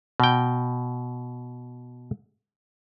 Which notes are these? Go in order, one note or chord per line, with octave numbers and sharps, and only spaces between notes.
B2 G5